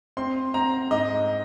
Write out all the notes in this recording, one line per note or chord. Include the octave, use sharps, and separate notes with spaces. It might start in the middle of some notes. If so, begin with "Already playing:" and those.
C4 C6
C4 A#5
G#2 D#5